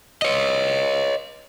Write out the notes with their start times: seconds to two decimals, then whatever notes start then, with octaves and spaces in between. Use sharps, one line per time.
0.22 C#5 D#5